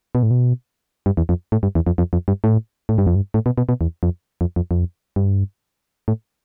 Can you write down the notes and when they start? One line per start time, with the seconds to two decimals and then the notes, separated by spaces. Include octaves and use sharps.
0.15 B2
0.23 A2
0.31 B2
1.06 G2
1.17 E2
1.29 F2
1.52 A2
1.63 G2
1.75 E2
1.87 F2
1.98 F2
2.13 F2
2.28 G2
2.44 A2
2.89 A2
2.98 G2
3.07 F2
3.15 G2
3.34 A2
3.46 B2
3.58 B2
3.69 B2
3.81 E2
4.03 F2
4.41 F2
4.56 F2
4.71 F2
5.16 G2
6.08 A2